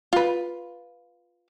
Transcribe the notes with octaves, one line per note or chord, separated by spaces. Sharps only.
F4 B4